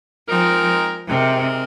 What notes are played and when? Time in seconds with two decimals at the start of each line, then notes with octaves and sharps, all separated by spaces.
0.28 F3 G#3 C4 D#4 A#4
1.08 C3 G#3 C4 D#4 A#4